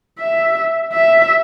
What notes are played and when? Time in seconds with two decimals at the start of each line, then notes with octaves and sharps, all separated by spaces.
0.20 E5
0.93 E5